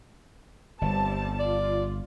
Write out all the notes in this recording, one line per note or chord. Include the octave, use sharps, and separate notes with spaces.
G1 G3 C4 A5
F4 D5